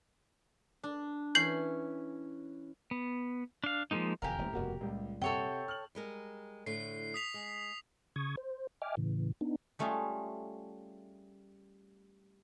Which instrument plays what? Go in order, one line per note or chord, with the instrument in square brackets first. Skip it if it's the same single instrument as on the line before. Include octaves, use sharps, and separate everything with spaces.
[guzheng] D4
[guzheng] E3 C#4 [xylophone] G6 C7 F#7
[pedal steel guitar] B3
D4 F5
F3 G3 G#3 A#3 D#4
[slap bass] E1 F2 D3 [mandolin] G4 A#4 [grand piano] F5 G#5
[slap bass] D#1 [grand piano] A2
[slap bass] F1 G2 B2 [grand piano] A#3 F#4
[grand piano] C#2 [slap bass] A#2 G3
[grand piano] C3 F#5 [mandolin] A4 C#5 G5
[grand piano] F6 F#7
[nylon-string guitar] G3 G#3 A#4
[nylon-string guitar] A2 D3 A3 [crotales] C7
[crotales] D#6 B6 F7
[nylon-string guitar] G#3
[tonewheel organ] C#3 C#6 D#6 G#6
C5
D#5 E5 G5 G#5 D6 F6
A2 C#3 E3
B3 D4 D#4
[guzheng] G3 A3 C#4 F4 G#4